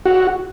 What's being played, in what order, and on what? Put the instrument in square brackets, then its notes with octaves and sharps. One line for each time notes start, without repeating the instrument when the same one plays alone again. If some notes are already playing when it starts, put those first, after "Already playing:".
[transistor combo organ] F#4